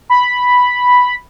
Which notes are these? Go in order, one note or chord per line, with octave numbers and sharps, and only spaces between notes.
B5